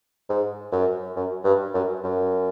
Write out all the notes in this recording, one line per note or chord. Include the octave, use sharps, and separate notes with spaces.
G#2
F#2
F#2
G2
F#2
F#2